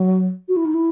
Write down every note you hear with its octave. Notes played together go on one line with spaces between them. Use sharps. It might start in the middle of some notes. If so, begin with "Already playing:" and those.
Already playing: F#3
F#4
E4
D#4
E4